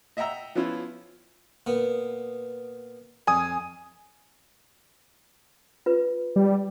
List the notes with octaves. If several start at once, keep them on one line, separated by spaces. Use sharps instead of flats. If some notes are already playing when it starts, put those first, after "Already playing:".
D#5 E5 F#5 G5 A#5 E6
F3 B3 C#4 E4 F4
A#2 B3
F2 G#5 D#6
F4 B4
G3